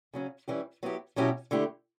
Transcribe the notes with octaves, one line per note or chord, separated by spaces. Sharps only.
C#3 F#3 C#4
E3 G3 C#4 G4
F#3 B3 E4 G4
B2 F#3 C#4 E4 G4
D3 A3 E4 G4